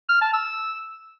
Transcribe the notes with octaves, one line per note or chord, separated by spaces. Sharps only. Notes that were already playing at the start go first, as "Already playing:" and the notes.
F6
A5
E6